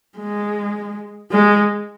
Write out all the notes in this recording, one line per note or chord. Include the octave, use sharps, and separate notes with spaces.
G#3
G#3